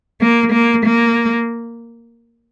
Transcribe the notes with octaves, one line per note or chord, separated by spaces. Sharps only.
A#3
A#3
A#3